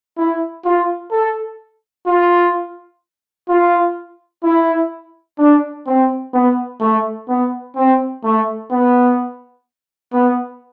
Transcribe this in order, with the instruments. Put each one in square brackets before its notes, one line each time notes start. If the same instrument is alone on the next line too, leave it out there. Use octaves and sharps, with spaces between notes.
[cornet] E4
F4
A4
F4
F4
E4
D4
C4
B3
A3
B3
C4
A3
B3
B3